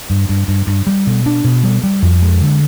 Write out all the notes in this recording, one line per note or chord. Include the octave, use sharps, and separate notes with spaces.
G2
G2
G2
G2
G3
B2
D4
B2
G3
G3
F2
G#3
D3